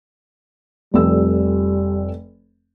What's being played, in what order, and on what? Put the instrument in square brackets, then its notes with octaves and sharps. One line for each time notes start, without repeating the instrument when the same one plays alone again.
[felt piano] F1 F2 E6 [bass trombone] G3